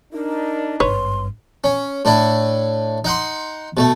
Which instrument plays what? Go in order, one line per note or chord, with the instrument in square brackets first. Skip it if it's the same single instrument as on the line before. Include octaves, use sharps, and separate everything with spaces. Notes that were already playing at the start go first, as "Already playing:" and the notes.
[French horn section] D4 D#4 [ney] A#4
[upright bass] G#1 G2 [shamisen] B4 C#5 [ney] C6
[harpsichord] C#4
A2 D4 E4
D#4 F#5 C6
B2 A3